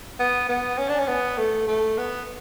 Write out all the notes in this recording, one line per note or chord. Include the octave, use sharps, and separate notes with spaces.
B3
B3
C#4
D4
C#4
B3
A3
A3
B3